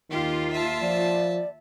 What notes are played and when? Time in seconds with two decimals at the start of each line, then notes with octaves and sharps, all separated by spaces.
0.11 D#2 D#3 F4 G4
0.52 E5 A5
0.82 F3 D5